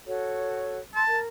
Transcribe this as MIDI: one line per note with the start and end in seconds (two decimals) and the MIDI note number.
0.07 0.79 66
0.07 0.79 69
0.07 0.79 73
0.95 1.19 81
0.95 1.03 84
1.07 1.28 70